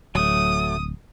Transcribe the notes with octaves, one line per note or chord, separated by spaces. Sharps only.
D1 F#3 A3 D#6